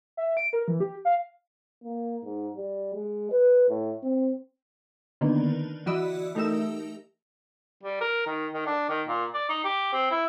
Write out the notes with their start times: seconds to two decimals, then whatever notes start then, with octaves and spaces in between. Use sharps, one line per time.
0.17 E5
0.37 D7
0.53 A#4
0.68 E3
0.80 G4
1.05 F5
1.84 A#3
2.25 G#2
2.57 G3
2.95 G#3
3.31 B4
3.69 A2
4.03 C4
5.21 D3 D#3 A#3 B3
5.86 E3 F#4 D5 D#5 B5 E6
6.35 A3 D#4 G4 A#4 E5 E6
7.83 G3
8.01 A#4
8.27 D#3
8.54 D#3
8.67 D4
8.90 D#3
9.08 A#2
9.34 D5
9.49 D#4
9.64 G4
9.93 C4
10.11 E4